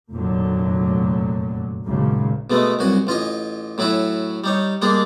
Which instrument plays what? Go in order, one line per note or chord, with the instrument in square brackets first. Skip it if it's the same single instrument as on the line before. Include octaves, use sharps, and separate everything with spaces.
[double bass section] F1 F#2 A#2 D3 F#3
G#1 F#2 A#2 C#3
[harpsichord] B2 G#3 A3 B3
C2 F#2 F#4 G#5
A1 F4 D#5 G#5
A2 F#3 E4 F#4 G#5
G3 D#4 C#5
G3 G#3 A#3 D4 G#4